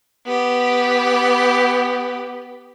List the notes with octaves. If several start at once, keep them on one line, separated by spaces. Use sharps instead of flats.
B3 G4